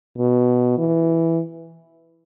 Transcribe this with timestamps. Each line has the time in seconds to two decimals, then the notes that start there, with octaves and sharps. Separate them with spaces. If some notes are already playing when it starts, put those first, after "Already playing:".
0.18 B2
0.78 E3